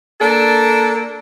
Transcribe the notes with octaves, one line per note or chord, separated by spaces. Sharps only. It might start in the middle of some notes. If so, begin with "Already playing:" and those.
A#3 D4 A4